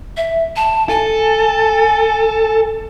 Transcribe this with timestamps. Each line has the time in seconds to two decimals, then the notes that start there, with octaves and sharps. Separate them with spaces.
0.17 E5
0.56 A5
0.89 A4 G#5